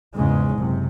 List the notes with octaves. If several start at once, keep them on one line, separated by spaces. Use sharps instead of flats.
E2 G#2 C#3 G#3
F#1 C3